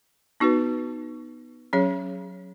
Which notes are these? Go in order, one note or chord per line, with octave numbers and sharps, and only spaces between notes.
B3 D#4 F#4 B4
F#3 C#4 G#4 C#5